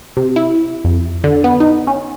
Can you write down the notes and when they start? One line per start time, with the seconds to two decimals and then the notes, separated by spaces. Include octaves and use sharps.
0.17 C3
0.36 E4
0.85 F2
1.24 D3
1.44 B3
1.60 D#4
1.87 C#4